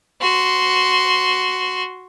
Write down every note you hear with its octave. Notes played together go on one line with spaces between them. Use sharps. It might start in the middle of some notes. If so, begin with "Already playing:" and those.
F#4 C6